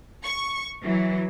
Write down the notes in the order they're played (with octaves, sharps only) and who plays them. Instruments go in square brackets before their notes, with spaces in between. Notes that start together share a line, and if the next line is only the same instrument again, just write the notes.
[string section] C#6
E3 F#3